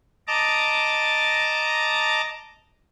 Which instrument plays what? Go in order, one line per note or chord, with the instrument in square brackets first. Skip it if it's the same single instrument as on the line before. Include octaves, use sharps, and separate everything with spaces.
[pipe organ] D#5 A5 A#5 D6